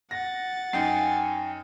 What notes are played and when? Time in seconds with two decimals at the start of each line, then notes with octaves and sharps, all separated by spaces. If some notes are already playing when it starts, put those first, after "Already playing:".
0.11 F#5 A6 A#6
0.73 F#2 D#4 G5 G#5 C7